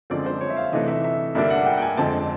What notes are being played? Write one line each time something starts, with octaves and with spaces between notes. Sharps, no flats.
F#2 D3 F3 G#3 C4 D5
C5
C#5
E5
F5
C3 E3 A3 D4 D#5
E5
E5
G2 D3 G3 A#3 D4 E5
F#5
G5
G5
G#5
F2 D3 F3 G#3 C4 A5